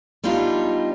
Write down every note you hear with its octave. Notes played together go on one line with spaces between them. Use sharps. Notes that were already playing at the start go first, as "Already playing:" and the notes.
G3 B3 D4 D#4 F4